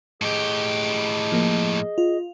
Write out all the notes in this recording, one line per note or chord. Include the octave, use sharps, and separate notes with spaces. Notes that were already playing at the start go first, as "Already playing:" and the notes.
A2 G4 G#4 D#5
F3 A#3
F4